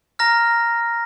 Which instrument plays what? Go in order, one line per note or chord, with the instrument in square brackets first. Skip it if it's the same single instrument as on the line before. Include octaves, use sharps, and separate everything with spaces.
[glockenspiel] A#5 F6 A#6